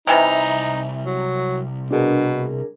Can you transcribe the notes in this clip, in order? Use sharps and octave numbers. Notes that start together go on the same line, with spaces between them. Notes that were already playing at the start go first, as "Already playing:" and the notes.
C2 C3 E3 G3 D#4 A#5
F#3
B2 D4 G#4 A#4